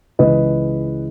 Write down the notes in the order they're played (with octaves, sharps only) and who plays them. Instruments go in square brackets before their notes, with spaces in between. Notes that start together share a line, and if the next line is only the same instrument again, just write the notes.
[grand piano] C#2 C#3 E3 G#3 B4 D#5